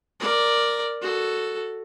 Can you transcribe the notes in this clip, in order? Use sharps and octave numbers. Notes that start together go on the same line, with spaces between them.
A#4 D5
F#4 A4